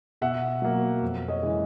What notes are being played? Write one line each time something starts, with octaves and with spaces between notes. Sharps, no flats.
B2 E5 F#5
F#3 A#3
F2
C#5 D#5
C#3 E3 G#3